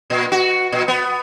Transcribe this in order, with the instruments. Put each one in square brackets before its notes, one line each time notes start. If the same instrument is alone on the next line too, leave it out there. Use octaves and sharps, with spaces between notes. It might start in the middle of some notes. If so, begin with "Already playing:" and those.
[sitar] A#2
F#4
A#2
B3